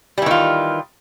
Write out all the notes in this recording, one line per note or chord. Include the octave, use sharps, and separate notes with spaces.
D#3 E3 G3 F4